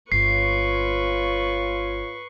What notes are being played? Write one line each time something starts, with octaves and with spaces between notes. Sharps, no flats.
G1 F4 B4 C#5 C#6 C7